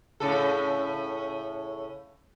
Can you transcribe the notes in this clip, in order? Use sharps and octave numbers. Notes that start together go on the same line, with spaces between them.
A2 C#3 A4